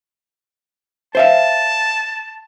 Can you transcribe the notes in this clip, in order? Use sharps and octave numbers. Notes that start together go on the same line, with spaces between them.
C5 E5 F5 A5